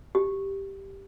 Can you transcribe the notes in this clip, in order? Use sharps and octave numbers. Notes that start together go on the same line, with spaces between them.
G4